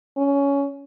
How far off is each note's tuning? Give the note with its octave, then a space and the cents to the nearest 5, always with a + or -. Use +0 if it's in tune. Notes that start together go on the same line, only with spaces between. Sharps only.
C#4 +15